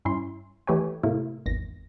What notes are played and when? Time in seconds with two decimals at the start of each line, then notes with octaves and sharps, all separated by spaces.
0.05 G2 C#4 E4 C6
0.67 E3 A3 G4 B4 C#5 G#5
1.03 A2 C3 A3 A#3 E4
1.46 G#1 E2 A#6